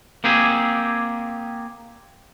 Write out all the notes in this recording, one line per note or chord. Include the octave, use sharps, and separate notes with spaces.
A#3 C4 G4 G#4